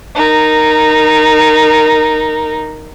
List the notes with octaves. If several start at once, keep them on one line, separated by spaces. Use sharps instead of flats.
D#4 A#4